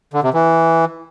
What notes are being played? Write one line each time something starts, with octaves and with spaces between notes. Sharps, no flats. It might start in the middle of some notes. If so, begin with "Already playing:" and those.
D3
C3
E3